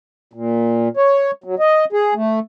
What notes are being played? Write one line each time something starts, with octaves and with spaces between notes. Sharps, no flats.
A#2
C#5
F#3
D#5
G#4
A3